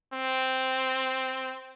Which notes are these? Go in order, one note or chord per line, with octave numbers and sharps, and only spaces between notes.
C4